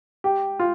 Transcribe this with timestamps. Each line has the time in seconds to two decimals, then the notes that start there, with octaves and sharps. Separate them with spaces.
0.24 G4
0.60 F4